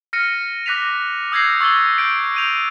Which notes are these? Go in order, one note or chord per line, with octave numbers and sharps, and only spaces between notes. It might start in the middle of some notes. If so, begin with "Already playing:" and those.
F6 A#6 C#7 D#7
D6 F#6 A#6 B6 D#7 F7
D#6 E6 G6 G#6 A#6 C7
C#6 E6 A6 C7 G7
G6 C7 D7
G6 D#7 F7